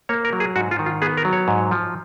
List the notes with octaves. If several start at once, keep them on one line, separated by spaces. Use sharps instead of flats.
A#3 C#5
A#4
F#3
G#4
G#2 F#4
F4
D#3
F4
B3 G#4
A#4
F#3
C#5
G#2
F3